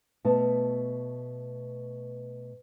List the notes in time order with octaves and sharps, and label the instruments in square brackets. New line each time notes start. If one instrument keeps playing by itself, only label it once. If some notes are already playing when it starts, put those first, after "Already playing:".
[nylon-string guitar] B2 A3 A5